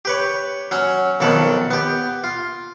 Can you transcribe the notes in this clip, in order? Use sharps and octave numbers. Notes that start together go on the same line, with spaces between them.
G4 B4 C#5
F#3 C#4
B1 F2 D#3 C#5 A5 B5
B3 G4
F4